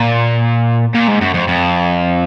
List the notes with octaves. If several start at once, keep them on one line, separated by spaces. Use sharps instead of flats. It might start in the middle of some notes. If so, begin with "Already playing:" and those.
Already playing: A#2
A#2
G#2
F#2
F2
F2